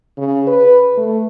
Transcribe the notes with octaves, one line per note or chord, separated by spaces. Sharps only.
C#3
B4
A3